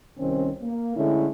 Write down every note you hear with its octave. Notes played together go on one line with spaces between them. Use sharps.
C2 D#3 C4 C#4
A#3
A2 D3 G#3 A3 C#4 E4